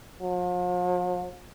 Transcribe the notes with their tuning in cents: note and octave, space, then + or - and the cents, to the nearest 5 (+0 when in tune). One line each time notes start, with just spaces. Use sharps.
F3 +45